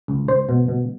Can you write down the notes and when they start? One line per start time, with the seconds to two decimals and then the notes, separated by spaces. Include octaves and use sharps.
0.08 C#2
0.28 C#2 C5
0.49 B2
0.68 B2